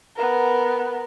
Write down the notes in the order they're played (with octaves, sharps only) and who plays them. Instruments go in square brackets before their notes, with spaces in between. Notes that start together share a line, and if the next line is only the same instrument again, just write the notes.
[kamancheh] B3 A#4